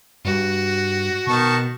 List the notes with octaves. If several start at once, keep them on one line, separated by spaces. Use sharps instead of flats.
G2 F#4
B2 D#3 A5 C#6